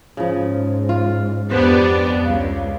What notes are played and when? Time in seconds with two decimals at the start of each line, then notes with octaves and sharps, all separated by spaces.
0.17 G#2 C#3 F3
0.89 F4
1.51 F2 B3 D4 G4 C5
2.24 C#2 F5